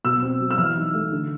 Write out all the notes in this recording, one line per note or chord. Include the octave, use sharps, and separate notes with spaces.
B2 E6
C4
F#3
E6
E3 F6
D#4
A3
D3